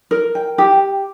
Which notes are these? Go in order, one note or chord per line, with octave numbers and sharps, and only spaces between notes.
A#4
G5
G4